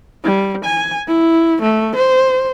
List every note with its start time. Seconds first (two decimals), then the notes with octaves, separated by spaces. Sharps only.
0.24 G3
0.64 G#5
1.07 E4
1.62 A3
1.95 C5